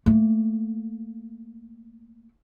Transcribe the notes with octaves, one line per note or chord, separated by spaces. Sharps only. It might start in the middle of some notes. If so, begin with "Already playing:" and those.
A3 A#3